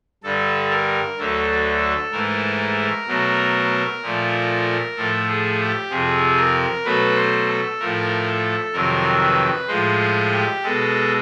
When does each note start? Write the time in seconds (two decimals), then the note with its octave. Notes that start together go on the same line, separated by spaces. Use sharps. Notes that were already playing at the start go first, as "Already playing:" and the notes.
0.23 G2 D3 G3 A4
0.70 A#4
1.18 D2 D3 F#3 A3 A4
2.12 G#2 E3 A3 A#4
3.07 B2 F#3 A3
4.02 A#2 F3 A3
4.96 A2 F3 A3 A4
5.28 G#4
5.59 G4
5.90 F2 C3 F3 G#4
6.37 A#4
6.85 B2 F#3 A3 B4
7.16 C5
7.47 A4
7.80 A2 F3 A3 A#4
8.27 A4
8.73 F2 C3 D#3 F#3 A#4
9.22 B4
9.68 A2 F3 G#3 C5
10.00 C5
10.31 G4
10.63 B2 G#3 A4